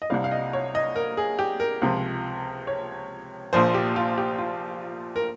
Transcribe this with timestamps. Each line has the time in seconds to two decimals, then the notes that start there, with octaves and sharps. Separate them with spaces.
0.02 D#5
0.10 C2 C3 G3 F5
0.24 F5
0.31 D#5
0.53 C#5
0.75 D#5
0.96 A#4
1.17 G#4
1.39 G4
1.60 A#4
1.82 C#2 C3 F3
2.67 C#5
3.53 A#1 A#2 F3 C5
3.74 G4
3.96 F4
4.18 G4
4.39 F4
5.16 A#4